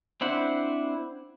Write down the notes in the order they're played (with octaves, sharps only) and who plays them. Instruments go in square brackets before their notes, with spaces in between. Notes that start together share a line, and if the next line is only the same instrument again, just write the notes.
[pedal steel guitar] C4 D4 E4 C5 F#5